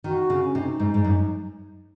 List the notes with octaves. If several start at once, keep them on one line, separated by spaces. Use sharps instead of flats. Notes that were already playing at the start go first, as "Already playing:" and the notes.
D#3 F#4
C#3
C#4
C3 D#4
G#2
G#2
F#2